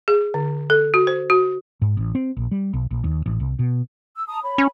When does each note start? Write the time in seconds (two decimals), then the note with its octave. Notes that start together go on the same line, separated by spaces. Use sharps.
0.08 G#4
0.34 D3
0.70 A4
0.94 F#4
1.07 C5
1.30 F#4
1.82 G#2
1.97 A1
2.15 C4
2.37 A#1
2.51 G3
2.73 B1
2.91 A#1
3.04 D#2
3.26 A1
3.40 C2
3.59 B2
4.16 E6
4.28 A5 A#5 D#6
4.42 C#5 B5
4.58 C#4